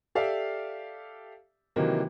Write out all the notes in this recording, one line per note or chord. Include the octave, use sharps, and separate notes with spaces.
G4 A4 D5 E5 F5
C3 D#3 E3 F#3 A#3